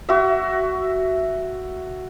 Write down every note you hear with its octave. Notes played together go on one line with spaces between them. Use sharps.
F#4 E5